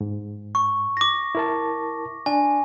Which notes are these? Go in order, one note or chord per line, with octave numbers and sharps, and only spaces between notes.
G#2
C#6
D6 A#6
E4 A#4 A5
D4 G#5